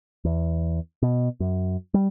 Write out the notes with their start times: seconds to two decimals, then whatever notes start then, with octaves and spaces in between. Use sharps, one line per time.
0.25 E2
1.02 B2
1.40 F#2
1.94 G3